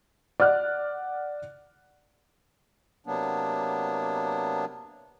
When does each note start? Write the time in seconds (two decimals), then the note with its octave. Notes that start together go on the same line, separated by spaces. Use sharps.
0.40 D5 F#5 F6 F#6
3.07 C3 F#3 A#3 B3 D4